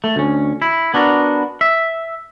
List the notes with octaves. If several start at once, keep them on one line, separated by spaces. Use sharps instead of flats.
A3
D2 C#4
E4
B3 D4 F#4 A#4
E5